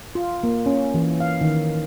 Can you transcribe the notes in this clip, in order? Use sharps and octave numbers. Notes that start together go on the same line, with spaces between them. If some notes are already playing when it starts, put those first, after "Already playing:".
F4
A#3
C#4
E3
F5
D#3